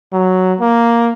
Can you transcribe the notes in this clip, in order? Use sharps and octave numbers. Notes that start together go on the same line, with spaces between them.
F#3
A#3